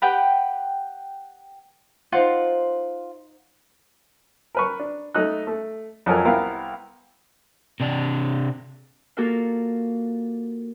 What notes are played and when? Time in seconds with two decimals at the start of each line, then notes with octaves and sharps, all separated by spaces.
0.02 G4 B4 F#5 G5
2.12 D#4 F4 C5 F#5
4.55 A#4 B4 C#6
4.79 D4
5.14 A3 D#4 D#6 F#6
5.47 A3
6.06 F2 F#3 A4 A#4 G#5
6.25 C2 B3 E4 A#4 F5
7.81 C3 D4
9.17 A#3 F4 F#4 A4 A#4 F5